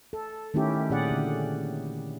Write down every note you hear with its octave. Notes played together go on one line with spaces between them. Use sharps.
A4
D#3 A3 C#4 E4 G4
A#2 C#4 G#4 D5 F#5
D3